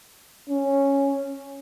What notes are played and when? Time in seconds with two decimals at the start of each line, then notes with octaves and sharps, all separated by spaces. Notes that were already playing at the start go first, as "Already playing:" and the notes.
0.49 C#4